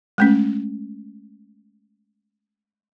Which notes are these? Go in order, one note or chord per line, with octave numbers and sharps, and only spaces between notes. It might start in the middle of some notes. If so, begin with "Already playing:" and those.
G#3 A3 C#4